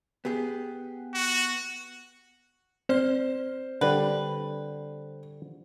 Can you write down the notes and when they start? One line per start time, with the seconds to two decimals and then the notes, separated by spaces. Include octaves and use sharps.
0.25 B3 G4 G#4
1.14 F#4
2.89 C4 C5 D5 F6
3.81 D3 G3 B4